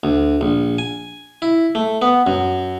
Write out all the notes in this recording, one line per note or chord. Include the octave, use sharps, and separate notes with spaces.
D2
A#1
G#5
E4
A3
B3
F#2